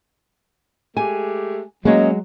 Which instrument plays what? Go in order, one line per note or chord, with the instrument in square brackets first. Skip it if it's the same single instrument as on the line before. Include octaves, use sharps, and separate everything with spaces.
[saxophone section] G#3 A3 G4 [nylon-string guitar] G#5
[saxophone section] F#3 [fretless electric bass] G#3 [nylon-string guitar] A#3 C#4 C#5 [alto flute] D#5